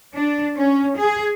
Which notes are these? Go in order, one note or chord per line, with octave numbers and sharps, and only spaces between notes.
D4
C#4
G#4